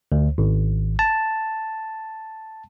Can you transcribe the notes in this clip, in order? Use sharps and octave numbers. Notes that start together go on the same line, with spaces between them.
D2
G#1
A5